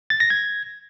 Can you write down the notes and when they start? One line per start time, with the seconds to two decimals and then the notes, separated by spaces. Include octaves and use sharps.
0.10 A6
0.20 A#6
0.30 G#6